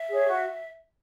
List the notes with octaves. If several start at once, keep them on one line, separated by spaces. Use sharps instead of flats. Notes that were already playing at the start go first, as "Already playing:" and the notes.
Already playing: E5
G#4 C#5
F#4